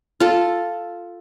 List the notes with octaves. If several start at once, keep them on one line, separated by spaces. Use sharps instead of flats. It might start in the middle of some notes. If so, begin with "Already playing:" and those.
F4 A4